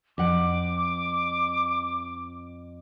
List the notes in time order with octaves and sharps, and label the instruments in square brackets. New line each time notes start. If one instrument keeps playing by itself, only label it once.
[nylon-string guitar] F2 F#5 [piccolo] D6